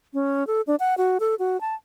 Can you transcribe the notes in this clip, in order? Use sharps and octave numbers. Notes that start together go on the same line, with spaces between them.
C#4
A4
D4
F#5
F#4
A4
F#4
A5